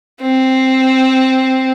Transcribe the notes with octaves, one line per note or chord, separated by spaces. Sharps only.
C4